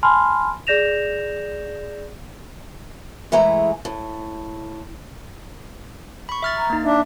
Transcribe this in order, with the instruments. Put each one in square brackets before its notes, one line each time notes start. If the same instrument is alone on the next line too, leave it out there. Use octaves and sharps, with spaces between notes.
[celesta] G#5 A5 B5 C6 F6
G#4 D5 G6 A#6 E7 F7
[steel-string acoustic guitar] E3 G#3 A3 E4 G#4 A#5
A2
[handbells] B5 C#6
E5 F6 A6
[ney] A#5
[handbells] A#3 D#4
[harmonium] D4 [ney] E5